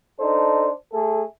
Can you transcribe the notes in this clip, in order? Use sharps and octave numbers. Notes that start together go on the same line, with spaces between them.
D4 D#4 A4 C5
A3 G#4 A4